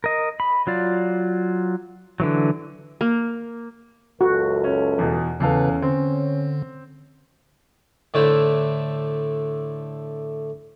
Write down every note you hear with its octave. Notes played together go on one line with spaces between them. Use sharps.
A#4 D#5
B5
F#3 F4 D5
D3 E3 F#3
A#3
C#2 F#2 F#4 A4
C#4
E2 B2
E2 C#3 C#4 A4 B4 F5
D3 C4
A2 D3 A3 D4 E4 C5